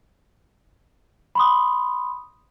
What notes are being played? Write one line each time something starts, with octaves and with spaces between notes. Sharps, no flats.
B5 C6 D#6